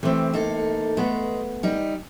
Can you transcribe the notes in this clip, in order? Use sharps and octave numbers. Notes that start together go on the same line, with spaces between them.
C3 E3 A3 C4 G4
A#3 D#4 A4
G#3 A3 B3
G3 D#4